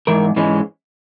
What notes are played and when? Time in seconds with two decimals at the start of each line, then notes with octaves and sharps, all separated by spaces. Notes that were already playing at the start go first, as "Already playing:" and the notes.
0.07 G#2 E3 A#4
0.36 G#2 E3 G#3 C#4